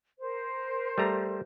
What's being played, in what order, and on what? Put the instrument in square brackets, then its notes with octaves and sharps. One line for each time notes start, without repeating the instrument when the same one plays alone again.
[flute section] A#4 C5
[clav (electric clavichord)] G3 A3 A#5